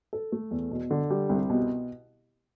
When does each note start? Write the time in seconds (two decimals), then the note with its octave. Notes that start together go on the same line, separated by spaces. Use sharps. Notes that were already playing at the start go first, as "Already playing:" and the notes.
0.13 A4
0.32 A3
0.51 E2
0.71 B2
0.91 D3
1.10 G3
1.29 C2
1.50 B2